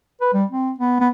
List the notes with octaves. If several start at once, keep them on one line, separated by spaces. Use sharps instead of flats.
B4
G3
C4
B3
B3